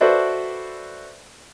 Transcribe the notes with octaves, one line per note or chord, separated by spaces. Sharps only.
F#4 A4 B4 C5 D5 E5